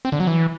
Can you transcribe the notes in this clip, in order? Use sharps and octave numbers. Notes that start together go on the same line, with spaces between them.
C4
D3
F#3
E3